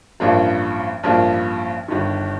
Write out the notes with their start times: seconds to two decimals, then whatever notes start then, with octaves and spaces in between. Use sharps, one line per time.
0.20 A1 G2 F3 A#3 D4
1.03 A1 G2 F3 A#3 D4
1.88 G1 G2 D#3